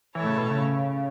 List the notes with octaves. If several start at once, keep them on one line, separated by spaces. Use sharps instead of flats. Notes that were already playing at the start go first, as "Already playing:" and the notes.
A2 E3 A3 E4 A4 C#5
C#3
B2
C#3